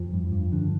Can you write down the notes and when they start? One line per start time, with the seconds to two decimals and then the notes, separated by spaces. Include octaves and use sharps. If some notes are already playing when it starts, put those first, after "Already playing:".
Already playing: F2 F3
0.14 G2
0.32 G2
0.52 D3